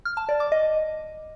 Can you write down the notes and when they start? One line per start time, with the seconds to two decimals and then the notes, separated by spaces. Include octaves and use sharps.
0.05 F6
0.17 A5
0.29 D5
0.40 D6
0.52 D#5